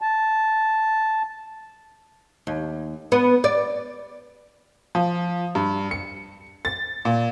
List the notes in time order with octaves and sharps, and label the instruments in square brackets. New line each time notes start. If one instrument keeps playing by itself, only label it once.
[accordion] A5
[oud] D#2
B3
D5
[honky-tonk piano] F3
G2
C#7
A6
A#2